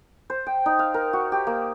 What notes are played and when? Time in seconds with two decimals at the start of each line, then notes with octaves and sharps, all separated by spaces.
0.30 C5
0.46 G5
0.66 D#4
0.79 F5
0.94 A#4
1.13 F#4
1.32 G4
1.47 A#3